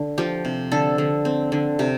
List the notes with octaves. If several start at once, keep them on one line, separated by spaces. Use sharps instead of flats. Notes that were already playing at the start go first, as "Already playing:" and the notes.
Already playing: D3
F3 G4
C3
D3 A4
D3
C4
D3
C3 G4